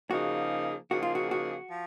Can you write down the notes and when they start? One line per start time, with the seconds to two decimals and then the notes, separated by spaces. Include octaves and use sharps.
0.11 C#3 F3 A#3 D#4 F#4 G#4
0.90 C#3 F3 A#3 D#4 F#4 G#4
1.03 F4
1.15 F#4
1.31 F#4
1.71 F3